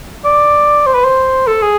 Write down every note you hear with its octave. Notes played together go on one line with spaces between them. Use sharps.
D5
C5
B4
C5
A4
G#4